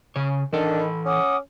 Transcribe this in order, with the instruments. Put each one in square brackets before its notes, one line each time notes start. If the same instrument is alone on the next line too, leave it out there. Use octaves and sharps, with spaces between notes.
[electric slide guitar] C#3 C#5
[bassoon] D#3 [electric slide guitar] E3 A4 [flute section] D4 D5
[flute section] B5
[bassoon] C#4 [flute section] F#5 D6 D#6